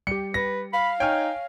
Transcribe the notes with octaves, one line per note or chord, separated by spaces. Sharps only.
G3 G4 C#7
B4 A#6
F5 B5
D#4 C#5 G5 G#5 F6